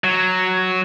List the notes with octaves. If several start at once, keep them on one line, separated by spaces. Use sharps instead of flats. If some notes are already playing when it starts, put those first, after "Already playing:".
F#3